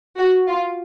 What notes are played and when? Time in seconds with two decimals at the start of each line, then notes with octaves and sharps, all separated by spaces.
0.18 F#4
0.48 F4